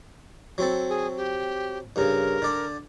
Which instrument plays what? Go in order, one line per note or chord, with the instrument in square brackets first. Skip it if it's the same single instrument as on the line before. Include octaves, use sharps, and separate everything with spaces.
[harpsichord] F#3 C4 A4
[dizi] G#4
G4
[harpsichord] G2 C#3 [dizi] A#4
[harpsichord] D3 D5